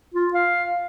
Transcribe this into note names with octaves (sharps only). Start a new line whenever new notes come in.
F4
F5